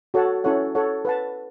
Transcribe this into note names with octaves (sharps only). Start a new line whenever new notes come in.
F#4 A4 C#5 F#5 A5
C#4 E4 A4 C#5 F#5
A4 C#5 F#5
B4 F#5 A5